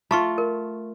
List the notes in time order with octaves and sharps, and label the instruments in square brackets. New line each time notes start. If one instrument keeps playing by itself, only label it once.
[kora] A3 F4 [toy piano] A5 C#6
[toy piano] A#4